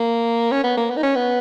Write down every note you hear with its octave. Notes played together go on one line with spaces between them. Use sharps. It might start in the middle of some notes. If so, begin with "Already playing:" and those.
Already playing: A#3
C#4
B3
A#3
B3
D#4
C#4
B3